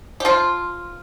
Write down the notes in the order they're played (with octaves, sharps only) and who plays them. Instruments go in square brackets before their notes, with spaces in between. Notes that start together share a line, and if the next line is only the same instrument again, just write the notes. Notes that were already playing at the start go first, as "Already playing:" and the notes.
[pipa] G4
F3 F4